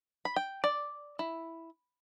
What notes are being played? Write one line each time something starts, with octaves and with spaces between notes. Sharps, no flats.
B5
G5
D5
E4